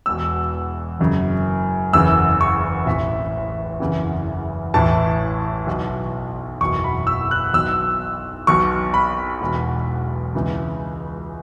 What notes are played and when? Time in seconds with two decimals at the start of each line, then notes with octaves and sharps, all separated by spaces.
0.06 E1 E2 B2 E6
0.99 F#1 F#2 C#3
1.93 F#1 E2 C#3 E3 E6
2.41 C#6
2.86 A1 A2 E3 E5
3.80 F#1 E2 C#3 E3
4.74 A1 A2 E3 A5
5.67 B1 B2
6.61 F#1 E2 B2 C#6
6.84 B5
7.07 E6
7.31 F#6
7.53 B1 B2 E6
8.47 B1 B2 C#6
8.94 B5
9.41 E1 E2 B2
10.35 C#2 C#3 E3